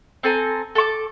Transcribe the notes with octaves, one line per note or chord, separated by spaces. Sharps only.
C4 A4 G#5 A#5
A4 A5 C#6 D6